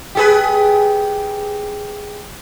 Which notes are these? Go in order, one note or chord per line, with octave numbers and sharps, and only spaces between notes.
G4 G#4 B4